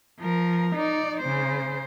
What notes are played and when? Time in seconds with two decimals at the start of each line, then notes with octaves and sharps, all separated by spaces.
0.19 F3 A#4
0.76 D#4 D5
1.21 C#3 C5